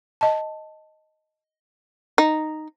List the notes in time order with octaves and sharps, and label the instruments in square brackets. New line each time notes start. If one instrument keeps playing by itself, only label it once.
[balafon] D#5 A5
[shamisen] D#4